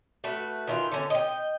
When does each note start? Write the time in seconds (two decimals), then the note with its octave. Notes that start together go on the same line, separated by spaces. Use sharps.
0.24 A3 F#4 B4
0.67 D#3 E3 F4
0.92 D3 C#4
1.10 D#5 G5